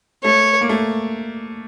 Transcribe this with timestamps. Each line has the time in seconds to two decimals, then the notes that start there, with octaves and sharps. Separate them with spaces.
0.24 A3 C#5
0.61 A#3
0.69 A3